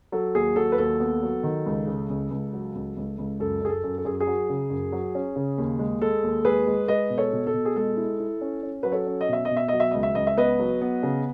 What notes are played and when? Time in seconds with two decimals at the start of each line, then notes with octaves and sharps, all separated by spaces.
0.12 F#3 A4
0.35 D#2 G#4
0.56 F#3 A4
0.72 B4
0.78 D#2 A4
1.00 B3
1.23 F#3
1.43 D#3
1.66 C#2
1.87 C#3
2.09 C#2
2.31 C#2
2.53 F#3
2.75 C#2
2.97 C#2
3.18 C#2
3.40 F#2 A4
3.62 F#2 G#4
3.69 A4
3.84 F#2
3.98 A4
4.05 F#2 G#4
4.20 G#4
4.27 F#3
4.49 C#3
4.70 F#2
4.92 F#3
5.15 C#4
5.36 C#3
5.58 D#2
5.79 G#3
6.01 G#3 A4
6.23 D#2
6.45 G#3 G#4 B4
6.67 G#3
6.88 G#3 B4 D#5
7.10 B2
7.18 A4 C#5
7.33 B2
7.47 A4
7.54 B2
7.65 G#4
7.76 G#3 A4
7.97 E4
8.20 E4
8.41 C#4
8.63 C#4
8.83 F#3 B4
8.92 A4 C#5
9.07 C#4
9.21 D#5
9.29 B2 E5
9.45 D#5
9.50 B2
9.57 E5
9.68 F#3 D#5
9.80 E5
9.91 C#2 D#5
10.03 E5
10.15 C#2 D#5
10.27 E5
10.37 B3 B4 D#5
10.60 F#3
10.81 B3
11.03 C#3